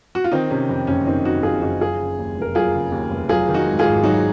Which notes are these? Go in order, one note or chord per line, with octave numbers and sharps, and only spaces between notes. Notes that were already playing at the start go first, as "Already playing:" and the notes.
F#4
F4
D#3 C4 D#4
C3 C#4
F2 C4
F#1 C#4
D#3 C4 D#4
C3 D#4 F#4
F2 F4 G#4
F#1 D#4 F#4
F#3 F4 G#4
C#3
D#2
F1 A#4
F#3 F4 G#4
C#3
D#2
F1
F#3 F4 G#4
D#3
D#4 F#4
G#2
F4 G#4
G#1
F#3 D#4 F#4